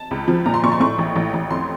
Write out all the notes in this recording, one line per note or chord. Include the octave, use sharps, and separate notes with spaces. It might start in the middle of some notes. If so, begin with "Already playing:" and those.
Already playing: A5
C#2
F3
A#2 A#5
C6
A#2 C#6
C6
A2 C#6
A1
A1
A1
F2 C6